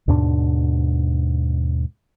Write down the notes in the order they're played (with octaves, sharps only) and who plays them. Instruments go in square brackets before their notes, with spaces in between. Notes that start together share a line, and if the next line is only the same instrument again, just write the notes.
[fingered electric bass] D#2 G#2 B2 D4